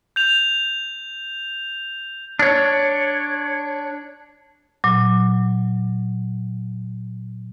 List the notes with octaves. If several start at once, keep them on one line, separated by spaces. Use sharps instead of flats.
G6 F7
D4 C#5
A#2 F#3